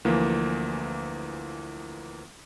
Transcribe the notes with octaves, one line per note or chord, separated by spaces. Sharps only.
D2 E3 F3 A#3